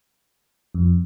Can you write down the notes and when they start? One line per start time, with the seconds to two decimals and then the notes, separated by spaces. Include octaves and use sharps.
0.75 F2